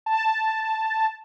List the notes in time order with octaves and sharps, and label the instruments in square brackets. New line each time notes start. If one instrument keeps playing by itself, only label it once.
[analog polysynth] A5